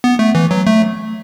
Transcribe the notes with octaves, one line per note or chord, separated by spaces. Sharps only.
B3
A3
E3
F#3
A3